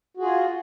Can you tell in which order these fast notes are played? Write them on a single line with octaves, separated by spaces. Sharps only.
F#4 G#4 F4